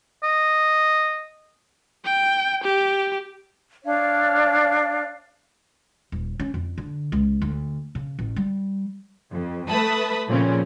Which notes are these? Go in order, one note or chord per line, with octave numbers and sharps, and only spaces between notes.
D#5
G5
G4
D4 C#5 D5 F5
D#1
C#4
F2
D3
C#2
D2
C#3
A1
G3
F2
A3 B4 E5 A5 B5 D#6
A#2 C#3 F3 C4 C#4